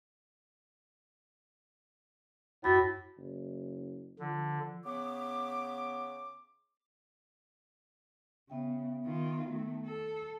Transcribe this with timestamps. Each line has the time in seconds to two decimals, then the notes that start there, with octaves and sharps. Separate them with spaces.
2.64 F#2 A2 F#4 B5
3.17 F#1
4.20 D3 F3
4.86 C#3 B3 D6
8.50 C#3 B3 E5 G5
9.05 D#3 F4
9.47 D#3 A3
9.85 A4